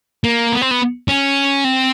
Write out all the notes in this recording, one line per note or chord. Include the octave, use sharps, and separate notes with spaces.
A#3
B3
C4
B3
C#4
C4